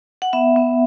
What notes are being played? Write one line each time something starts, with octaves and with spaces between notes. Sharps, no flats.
F#5
B3 E5
B3